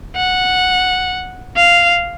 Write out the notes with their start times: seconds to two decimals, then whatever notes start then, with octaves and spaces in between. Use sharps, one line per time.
0.16 F#5
1.56 F5